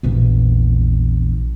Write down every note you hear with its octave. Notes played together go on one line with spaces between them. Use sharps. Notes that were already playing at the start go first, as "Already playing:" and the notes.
A#1 E2